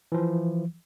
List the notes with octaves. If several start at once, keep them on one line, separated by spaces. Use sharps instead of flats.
E3 F3